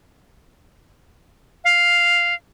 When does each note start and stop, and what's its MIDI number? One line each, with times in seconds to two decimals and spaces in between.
1.64 2.34 77